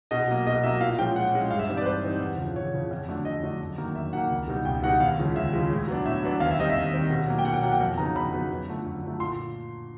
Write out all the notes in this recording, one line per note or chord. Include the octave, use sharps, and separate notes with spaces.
B2 D#5
F#3 A#3
B2 D#5
F#3 A#3 E5
A#2 F5
F3 G#3 C#4 G5
A#2 F#5
F3 G#3 C#4
G2 F5
E5
E3 G3 C4 D#4
D5
B4
G2 C5
E3 G3 C4 D#4
E2
C#3 F3
E2 C#5
C#3 F3
F2
D3 F#3 A3 D4
F2 D#5
D3 F#3 A3 D4
F#2
D#3 F#3 A#3
F#2 E5
D#3 F#3 A#3 F#5
C#2
B2 G3 B3 D#4
C#2 G5
B2 G3 B3 D#4 F#5
D#2 F5
C#3 F3 G#3
D#2 E5
C#3 F3 G#3
A2
F#3 B3 D4
A2 E5
F#3 B3 D4
D#2 F5
E5
D#3 G3 C4 D#5
E5
D#2
D#3 G3 C4
B2
F#3 A#3
G5
B2 F#5
G5
F#3 A#3 F#5
G5
F2
C#3 F#3 B3 D#4 A#5
F2 B5
C#3 F#3 B3 D#4
F#2
D3 F3 A3
F#2
D3 F3 A3
A#2 C6